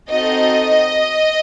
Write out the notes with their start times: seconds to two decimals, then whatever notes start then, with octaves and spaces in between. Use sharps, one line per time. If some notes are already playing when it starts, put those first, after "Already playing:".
0.10 C4 D#4 F#4 A4 D#5